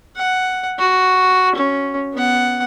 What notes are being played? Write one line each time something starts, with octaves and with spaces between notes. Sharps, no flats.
F#5
F#4
C#4
B3 F#5